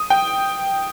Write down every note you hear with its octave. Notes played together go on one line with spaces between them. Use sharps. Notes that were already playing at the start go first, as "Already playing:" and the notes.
Already playing: D#6
G5